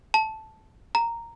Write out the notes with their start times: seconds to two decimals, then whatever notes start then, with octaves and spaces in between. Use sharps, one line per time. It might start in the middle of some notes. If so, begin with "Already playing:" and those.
0.14 A5
0.95 A#5